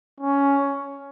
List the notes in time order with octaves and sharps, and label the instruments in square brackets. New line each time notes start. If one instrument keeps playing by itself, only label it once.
[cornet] C#4